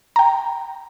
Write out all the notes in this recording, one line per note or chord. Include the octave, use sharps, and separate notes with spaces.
G5 A#5